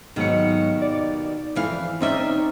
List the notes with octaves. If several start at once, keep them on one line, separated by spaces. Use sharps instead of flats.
D#2 G#2 B2 D#3 F#3 C#7
D5
F2 E3 F5
D2 C4 C#4 D#4 D5 E5